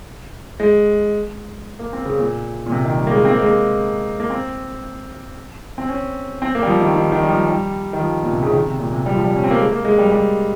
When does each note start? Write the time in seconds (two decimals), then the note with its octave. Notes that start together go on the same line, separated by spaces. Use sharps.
0.60 G#3
1.79 A#3
1.93 C4
2.06 C#3
2.19 A#2
2.66 A#2
2.71 C3
2.85 D#3
2.98 G3
3.07 A#3
3.11 G#3
3.25 C4
3.31 A#3
3.39 G#3
3.46 A#3
4.20 A#3
4.30 C4
5.78 C4
5.89 C#4
6.42 C4
6.55 A#3
6.62 G3
6.67 F3
6.81 D#3
6.94 D#3
7.12 D#3
7.23 G3
7.30 F3
7.47 G3
7.93 D#3
8.00 F3
8.23 A#2
8.33 C3
8.43 C#3
8.53 D#3
8.66 C3
8.79 A#2
8.92 C3
9.06 G3
9.15 F3
9.24 G3
9.36 C#4
9.44 C4
9.51 A#3
9.58 G#3
9.72 A#3
9.85 G#3
9.98 G3
10.11 G3